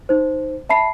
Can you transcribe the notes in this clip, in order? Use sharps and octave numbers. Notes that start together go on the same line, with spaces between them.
D#4 C5
E5 A5 B5 C7